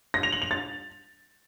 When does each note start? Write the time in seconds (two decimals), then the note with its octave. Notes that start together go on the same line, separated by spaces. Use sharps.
0.14 A#6
0.23 F7
0.32 F#7
0.42 F7
0.51 A6